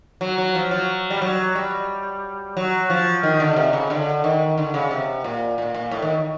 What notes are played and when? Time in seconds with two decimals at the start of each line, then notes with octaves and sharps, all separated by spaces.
0.21 F#3
0.38 F#3
0.55 F3
0.71 F#3
1.10 G3
1.22 F#3
1.55 G3
2.57 F#3
2.90 F3
3.23 D#3
3.40 D3
3.56 C3
3.73 C#3
3.90 D3
4.24 D#3
4.58 D3
4.74 C#3
4.91 C3
5.24 A#2
5.58 A#2
5.74 A#2
5.91 A2
6.02 D#3